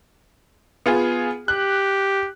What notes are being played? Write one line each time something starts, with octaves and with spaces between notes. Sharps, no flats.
B3 F4 G#4
G4 F#6